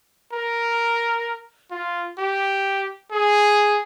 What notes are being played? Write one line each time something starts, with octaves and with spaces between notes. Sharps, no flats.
A#4
F4
G4
G#4